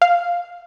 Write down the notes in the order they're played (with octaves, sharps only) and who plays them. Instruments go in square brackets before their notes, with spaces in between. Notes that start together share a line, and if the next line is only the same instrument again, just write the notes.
[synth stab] F5